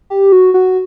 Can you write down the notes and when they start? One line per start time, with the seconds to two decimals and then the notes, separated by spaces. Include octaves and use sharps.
0.10 G4
0.32 F#4
0.54 F#4